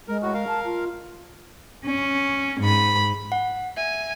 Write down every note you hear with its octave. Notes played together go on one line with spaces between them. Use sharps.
G#3 A#4
A2 F#4
A#4 F5
A5
F4
C#4
G#2 B5
F#5
E5 G#5